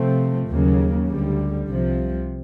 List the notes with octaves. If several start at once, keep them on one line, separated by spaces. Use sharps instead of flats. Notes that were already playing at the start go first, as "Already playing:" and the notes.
Already playing: C3 F3 A3 C4
D#2 C#3 F#3 A#3
D2 D3 G3
C2 C3 F3